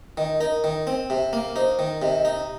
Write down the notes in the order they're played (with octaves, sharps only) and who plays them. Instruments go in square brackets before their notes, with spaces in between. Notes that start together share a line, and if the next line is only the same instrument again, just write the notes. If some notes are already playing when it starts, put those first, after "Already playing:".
[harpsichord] D#3 [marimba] D#5
[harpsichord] D#4 [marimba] A#4
[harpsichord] D#3
C4
C3
A#3
[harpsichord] D#4 [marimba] C5
[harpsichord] D#3
[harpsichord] C3 [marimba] D#5
[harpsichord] D#4